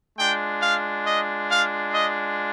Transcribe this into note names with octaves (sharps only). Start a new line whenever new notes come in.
G#3 D4 F4 G5
F5
D#5
F5
D#5